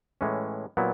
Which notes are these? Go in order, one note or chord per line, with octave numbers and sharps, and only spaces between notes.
A2 E3 G#3 C#4
A#2 F#3 B3 E4